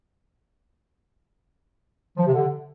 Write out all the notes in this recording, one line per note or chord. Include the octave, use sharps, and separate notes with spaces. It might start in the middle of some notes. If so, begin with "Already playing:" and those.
F3
C3
D3